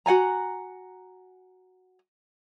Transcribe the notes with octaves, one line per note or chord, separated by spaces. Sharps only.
F#4 F#5 G#5 A#5